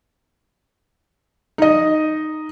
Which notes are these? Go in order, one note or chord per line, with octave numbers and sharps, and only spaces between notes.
D#4 D#5